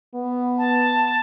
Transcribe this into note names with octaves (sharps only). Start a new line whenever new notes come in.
B3
A5